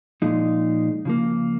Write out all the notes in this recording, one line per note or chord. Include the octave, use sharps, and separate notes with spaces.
A#2 F3 G#3 D#4
C#3 F3 A#3